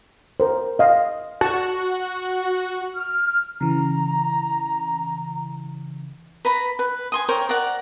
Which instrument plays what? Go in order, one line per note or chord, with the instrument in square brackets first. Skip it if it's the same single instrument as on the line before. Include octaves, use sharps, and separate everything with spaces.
[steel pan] A#4 C5
D#5 F5
[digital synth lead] F#4 [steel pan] A5
[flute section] F6
[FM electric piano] C#3 E3 [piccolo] A#5
[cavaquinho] B4 A#5 B5
B4
G#5 C6 D#6
A#4 C5 C#5 G5
A#4 D5 F#5